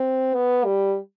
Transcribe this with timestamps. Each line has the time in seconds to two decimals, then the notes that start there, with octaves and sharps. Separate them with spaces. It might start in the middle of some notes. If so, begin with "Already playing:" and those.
Already playing: C4
0.35 B3
0.65 G3